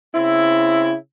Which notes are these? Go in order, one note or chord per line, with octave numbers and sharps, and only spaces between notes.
C#3 C4 E4